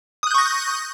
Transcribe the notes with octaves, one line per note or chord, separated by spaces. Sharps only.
C#6 D#6 F#6 G6 A#6